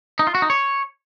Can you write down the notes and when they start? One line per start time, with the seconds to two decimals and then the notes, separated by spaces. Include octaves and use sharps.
0.19 D#4
0.27 F4
0.35 F#4
0.42 D#4
0.50 C#5